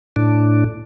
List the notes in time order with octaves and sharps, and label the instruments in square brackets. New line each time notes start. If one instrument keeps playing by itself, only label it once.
[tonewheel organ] A2 D4